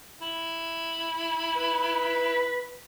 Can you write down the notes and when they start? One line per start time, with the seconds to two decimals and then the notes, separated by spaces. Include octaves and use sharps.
0.21 E4
1.55 B4